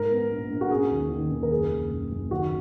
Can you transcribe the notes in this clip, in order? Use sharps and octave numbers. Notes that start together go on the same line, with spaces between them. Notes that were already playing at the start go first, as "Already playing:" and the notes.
Already playing: G#2 A#4
B3
A#1
A#1
F#4
C#4 G#4
D#2
D#3
D#2
A#4
F#1 G#4
F#1
F#1
F#1
D#3 F#4